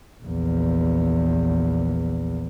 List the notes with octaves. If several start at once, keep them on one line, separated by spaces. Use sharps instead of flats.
A#1 E2